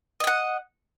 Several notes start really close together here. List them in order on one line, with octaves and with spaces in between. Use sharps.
D#5 G5 F#5